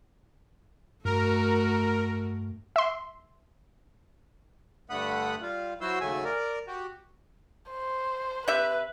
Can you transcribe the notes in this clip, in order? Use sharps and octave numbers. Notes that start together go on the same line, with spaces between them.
G2 A3 F#4 A#4
E5 C6
G2 D3 A3 F#5 B5 D#6
G3 F4
F#3 E4 F#4 C5 C6 E6
D#2 C#3 F#3 A3 E5 G#5
A#4 D5
F#4 G4
C5
C3 B4 E5